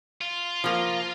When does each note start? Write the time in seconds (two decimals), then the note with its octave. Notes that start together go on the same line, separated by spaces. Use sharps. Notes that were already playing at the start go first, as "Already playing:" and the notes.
0.21 F4
0.64 F3 A#3